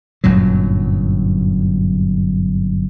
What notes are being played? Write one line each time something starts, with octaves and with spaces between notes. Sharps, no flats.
G1 F#2 A#2 F#3